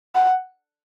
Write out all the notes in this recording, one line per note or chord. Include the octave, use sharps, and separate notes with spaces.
F#5